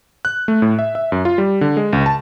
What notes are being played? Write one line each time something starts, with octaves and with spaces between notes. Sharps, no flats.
F#6
A3
A2
E5
E5
F#2
F4
G3
D3
G#3
C#2
A5